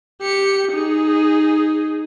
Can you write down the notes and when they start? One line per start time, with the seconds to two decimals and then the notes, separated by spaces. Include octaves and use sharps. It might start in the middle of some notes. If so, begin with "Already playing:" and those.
0.22 G4 C#7
0.72 D#4 G#4